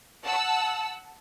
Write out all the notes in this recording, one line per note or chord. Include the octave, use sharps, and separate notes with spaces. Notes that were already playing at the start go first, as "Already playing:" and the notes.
F#5 A5 E6